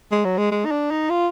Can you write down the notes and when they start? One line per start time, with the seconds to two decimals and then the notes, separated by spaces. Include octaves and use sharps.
0.11 G#3
0.25 F#3
0.38 G#3
0.51 G#3
0.65 D#4
0.71 D4
0.91 D#4
1.10 F4